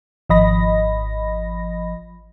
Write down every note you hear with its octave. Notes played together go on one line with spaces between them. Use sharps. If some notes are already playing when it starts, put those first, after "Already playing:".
G#1 F3 D#5 B5 A#6